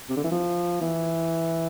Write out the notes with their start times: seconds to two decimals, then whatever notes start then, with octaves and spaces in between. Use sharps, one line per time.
0.10 C3
0.17 D3
0.24 E3
0.32 F3
0.81 E3